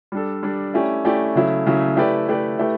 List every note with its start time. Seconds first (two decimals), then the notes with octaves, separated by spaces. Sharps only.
0.12 G3 D4 A4
0.43 G3 D4 A4
0.74 A3 C#4 E4 G4 D5
1.05 A3 C#4 E4 G4 D5
1.35 C#3 F#3 A3 E4
1.66 C#3 F#3 A3 E4
1.97 A3 E4 G4 B4 D5
2.28 A3 E4 G4 B4 D5
2.59 A3 E4 G4 B4